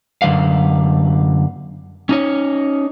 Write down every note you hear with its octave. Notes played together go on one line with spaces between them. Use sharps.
F#2 D3 E3 B4 F5
C#4 D#4 C#5